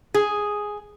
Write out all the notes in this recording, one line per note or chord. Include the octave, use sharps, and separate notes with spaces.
G#4